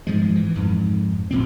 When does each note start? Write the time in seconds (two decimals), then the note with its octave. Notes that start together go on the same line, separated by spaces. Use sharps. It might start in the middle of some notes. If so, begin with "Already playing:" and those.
0.07 G#2 F3 G#3
0.36 E3
0.55 F2 G#2
1.31 E1 C2 A#2 C4